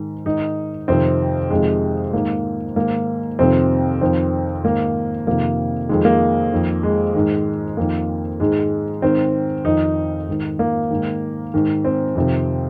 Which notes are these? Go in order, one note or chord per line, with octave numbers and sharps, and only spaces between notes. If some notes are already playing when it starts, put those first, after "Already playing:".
Already playing: G#2 D#3
G#2 D#3 D#4
F2 C3 D#3 C4
F2 C3 D#3 G#3
G#2 D#3 A#3
G#2 D#3 A#3
F2 C3 D#3 C4
F2 D#3 C4
G#2 D#3 A#3
F2 C3 D#3 A#3
F2 D#3 G#3
A#3
F2 D#3
G#3
G#2 D#3
F2 D#3 A#3
G#2 D#3 G#3
G#2 D#3 C4
F2 D#3 D#4
G#2 D#3
A#3
G#2 D#3
G#2 D#3
C4
F2 C3 D#3